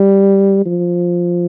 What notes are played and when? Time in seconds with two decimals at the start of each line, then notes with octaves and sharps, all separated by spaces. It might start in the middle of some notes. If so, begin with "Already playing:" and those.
Already playing: G3
0.66 F3